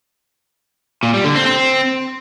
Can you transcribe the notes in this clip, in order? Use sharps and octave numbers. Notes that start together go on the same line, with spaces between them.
A#2
G3
D3
C4
C4